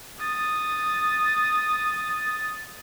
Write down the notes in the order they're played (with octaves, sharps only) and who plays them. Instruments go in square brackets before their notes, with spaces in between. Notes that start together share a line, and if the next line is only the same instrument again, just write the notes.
[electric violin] D#6 A6